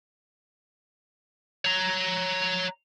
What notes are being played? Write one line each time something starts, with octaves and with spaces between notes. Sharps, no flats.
C#5 A#5